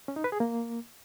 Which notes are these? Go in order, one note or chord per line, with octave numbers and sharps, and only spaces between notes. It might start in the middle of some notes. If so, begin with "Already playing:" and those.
C#4
D#4
B4
G#4
A#3